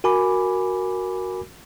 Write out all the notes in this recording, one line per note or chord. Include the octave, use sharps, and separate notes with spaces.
F#4 A#4 G#5 B5 D6